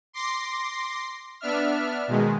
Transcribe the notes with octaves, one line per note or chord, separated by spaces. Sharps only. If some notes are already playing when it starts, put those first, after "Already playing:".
C6 D6 A#6 C7
B3 D4 E5 F6
B2 D#3 G#3